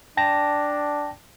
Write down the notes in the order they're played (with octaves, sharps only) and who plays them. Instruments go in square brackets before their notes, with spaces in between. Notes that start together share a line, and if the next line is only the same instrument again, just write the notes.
[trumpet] D4 [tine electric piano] G5 A5 A#6